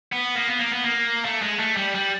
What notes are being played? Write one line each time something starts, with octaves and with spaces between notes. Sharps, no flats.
B3
A#3
B3
A#3
B3
A#3
A3
G#3
A3
G3
G3